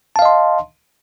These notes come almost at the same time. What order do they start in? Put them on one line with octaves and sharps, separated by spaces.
A5 F5 D#5 C6